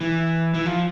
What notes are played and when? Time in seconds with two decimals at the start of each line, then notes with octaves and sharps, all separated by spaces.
0.01 E3
0.54 E3
0.66 F3